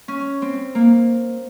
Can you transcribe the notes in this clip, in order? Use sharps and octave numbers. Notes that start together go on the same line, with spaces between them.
C#4
C4
A#3